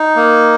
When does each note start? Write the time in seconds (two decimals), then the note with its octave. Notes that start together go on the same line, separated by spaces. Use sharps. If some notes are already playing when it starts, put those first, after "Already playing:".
Already playing: D#4
0.16 A#3